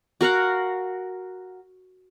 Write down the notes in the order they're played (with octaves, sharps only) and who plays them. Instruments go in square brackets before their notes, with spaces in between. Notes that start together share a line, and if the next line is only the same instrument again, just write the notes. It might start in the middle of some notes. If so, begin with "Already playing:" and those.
[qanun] F#4 A#4 F5 F#5